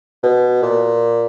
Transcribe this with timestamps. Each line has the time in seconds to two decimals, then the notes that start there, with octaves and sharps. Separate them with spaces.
0.23 B2
0.62 A#2